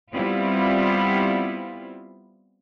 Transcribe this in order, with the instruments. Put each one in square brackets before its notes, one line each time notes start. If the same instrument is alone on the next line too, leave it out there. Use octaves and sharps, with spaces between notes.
[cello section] G3 B3 C4 E4 F4